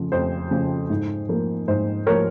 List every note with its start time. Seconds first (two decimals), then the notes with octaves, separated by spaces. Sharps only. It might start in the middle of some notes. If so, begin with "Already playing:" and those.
Already playing: F2 C#3 F3
0.12 F2 C5
0.51 C#3 F3
0.90 G#2
1.29 F3 A#3
1.68 G#2 C5
2.07 F3 A#3 A#4 C#5